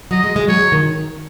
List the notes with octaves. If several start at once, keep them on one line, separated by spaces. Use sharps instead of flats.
F#3 D#5
G#3
G#3
F#3 C#5
F#3
D#3